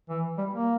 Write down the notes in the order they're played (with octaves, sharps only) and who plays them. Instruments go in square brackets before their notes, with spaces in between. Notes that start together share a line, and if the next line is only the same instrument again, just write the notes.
[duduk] E3
G3
A#3